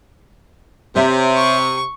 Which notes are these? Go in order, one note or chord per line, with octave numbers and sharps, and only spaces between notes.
C3 G4 C#5 E5
C#6